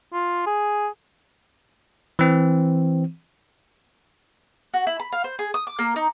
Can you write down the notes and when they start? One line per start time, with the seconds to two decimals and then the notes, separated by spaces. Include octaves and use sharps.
0.13 F4
0.47 G#4
2.19 E3 C4
4.74 F#4
4.87 E4
5.00 B5
5.13 F5
5.24 C5
5.39 G#4
5.54 D#6
5.67 D6
5.79 A#3
5.96 D#4